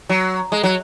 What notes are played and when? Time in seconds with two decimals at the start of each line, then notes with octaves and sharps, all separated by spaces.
0.09 F#3
0.52 G#3
0.63 F#3